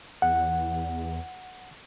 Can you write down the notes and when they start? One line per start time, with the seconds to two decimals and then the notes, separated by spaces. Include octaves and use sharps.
0.22 E2 F#5